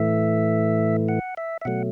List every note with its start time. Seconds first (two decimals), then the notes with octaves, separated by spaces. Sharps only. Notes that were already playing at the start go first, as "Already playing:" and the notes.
Already playing: A2 E3 A3 E5
1.09 F#5
1.37 E5
1.61 E5
1.65 B2 F#3 A3 F#5